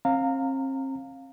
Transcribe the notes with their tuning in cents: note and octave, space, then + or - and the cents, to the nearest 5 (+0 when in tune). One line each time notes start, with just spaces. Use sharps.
C4 +40 F5 +10 A#5 -25